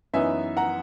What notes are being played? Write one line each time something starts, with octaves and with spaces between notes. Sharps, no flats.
F#2 E3 B3 D#4 E5 G#5
F#5 A#5